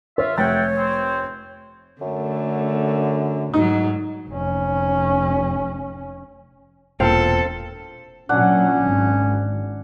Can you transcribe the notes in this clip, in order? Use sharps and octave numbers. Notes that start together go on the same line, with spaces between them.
F4 C#5 E5
F1 C#5 E5 F#5 G5 A6
C4
F#2 D3 A3
G#2 F#3 D#4
F1 C#4
E1 A#2 C4 A4 C5 F5
A#2 F#3 C#4 D4 F#5
G#1